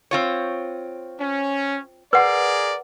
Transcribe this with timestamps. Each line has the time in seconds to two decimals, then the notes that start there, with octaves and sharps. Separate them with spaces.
0.11 C4 F4 C#5
1.20 C#4
2.13 G#4 A#4 B4 D5 F#5